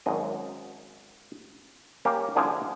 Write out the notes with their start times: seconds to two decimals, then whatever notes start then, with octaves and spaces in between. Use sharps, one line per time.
0.06 G#1 F#2 D#5
2.05 A#3 C#4 G4
2.36 C2 D3 F3 G#4 F#5 G#5